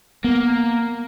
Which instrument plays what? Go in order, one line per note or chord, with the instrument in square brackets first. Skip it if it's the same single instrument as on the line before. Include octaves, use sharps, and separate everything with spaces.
[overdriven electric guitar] A#3 [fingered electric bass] B3